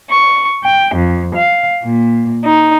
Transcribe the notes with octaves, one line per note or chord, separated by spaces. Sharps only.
C#6
G5
F2
F5
A#2
D#4